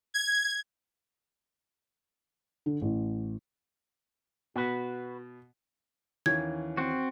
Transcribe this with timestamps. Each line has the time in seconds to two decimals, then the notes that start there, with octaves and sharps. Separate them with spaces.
0.14 G#6
2.66 D3
2.81 A1
4.56 B2 F#4 B4
6.26 D#2 E3 C#4 G#6
6.77 C4 F#4